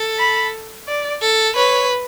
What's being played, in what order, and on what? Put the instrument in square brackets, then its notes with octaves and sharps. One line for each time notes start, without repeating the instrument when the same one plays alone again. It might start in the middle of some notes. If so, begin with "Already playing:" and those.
Already playing: [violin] A4
[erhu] B5
D5
[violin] A4
[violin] B4 [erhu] C#5